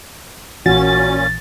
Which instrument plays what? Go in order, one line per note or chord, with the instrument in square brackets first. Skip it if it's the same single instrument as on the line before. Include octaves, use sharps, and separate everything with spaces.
[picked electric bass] A#1 E3 [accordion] A#2 C#4 [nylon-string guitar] F#4 [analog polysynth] A6